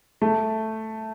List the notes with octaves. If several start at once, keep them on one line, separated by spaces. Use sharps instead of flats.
A3